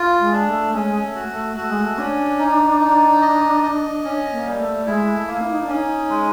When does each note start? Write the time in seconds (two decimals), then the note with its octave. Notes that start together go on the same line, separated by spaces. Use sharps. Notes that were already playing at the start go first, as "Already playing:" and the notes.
Already playing: F4
0.20 G#3
0.33 D4
0.47 A3
0.74 G#3 C#4
1.02 A3
1.15 F#4
1.29 A3
1.57 A3 F#4
1.70 G#3
1.83 A3
1.98 C#4 D4
2.39 D#4
2.80 D#4
3.22 D#5
3.63 D#5
4.04 C#4
4.32 A#3
4.45 G3
4.59 A3
4.86 G#3 E4
5.14 A3
5.28 A#3
5.41 E4
5.51 D#4
5.62 D4
5.68 C#4 D#4
6.09 G#3